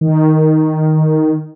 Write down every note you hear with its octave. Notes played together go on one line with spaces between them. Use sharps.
D#3